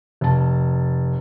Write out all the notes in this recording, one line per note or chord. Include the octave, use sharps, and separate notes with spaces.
F1 A5